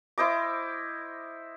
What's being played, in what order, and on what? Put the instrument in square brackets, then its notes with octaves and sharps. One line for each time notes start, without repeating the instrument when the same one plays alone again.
[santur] E4 C5 D#5 D6